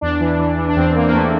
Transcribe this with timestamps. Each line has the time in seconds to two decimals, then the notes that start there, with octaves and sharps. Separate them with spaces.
0.01 E2 D4
0.20 E3
0.39 E3
0.58 E3
0.69 D4
0.76 E2 C4
0.94 E2 A#3
1.09 A#3
1.13 E2 A3